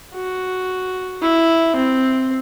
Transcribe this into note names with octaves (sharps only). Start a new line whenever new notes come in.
F#4
E4
C4